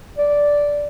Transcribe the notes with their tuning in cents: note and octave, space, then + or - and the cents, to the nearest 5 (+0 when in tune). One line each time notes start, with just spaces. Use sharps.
D5 -5